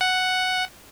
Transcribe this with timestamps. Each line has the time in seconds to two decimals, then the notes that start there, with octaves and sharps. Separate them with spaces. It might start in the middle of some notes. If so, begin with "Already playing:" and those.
0.01 F#5